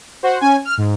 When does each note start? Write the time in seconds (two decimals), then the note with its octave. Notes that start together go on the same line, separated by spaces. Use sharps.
0.23 F#4 C5
0.41 C#4 G#5
0.65 F6
0.78 G#2